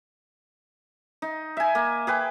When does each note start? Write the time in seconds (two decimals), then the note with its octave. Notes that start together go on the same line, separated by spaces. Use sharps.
1.22 D#4
1.57 E5 G#5
1.75 A#3
2.07 G#4 B4 G5